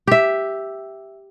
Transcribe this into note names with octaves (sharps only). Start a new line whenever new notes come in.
G4 E5